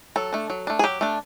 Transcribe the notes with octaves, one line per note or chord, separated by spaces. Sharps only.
F#3 A4
A3 D4
F#3
A3 D4
G#4
F#3 G4
A3 D4